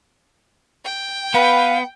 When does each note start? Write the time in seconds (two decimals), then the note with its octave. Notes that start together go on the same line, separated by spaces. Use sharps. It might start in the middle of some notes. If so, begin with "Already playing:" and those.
0.85 G5
1.34 B3 B4 F5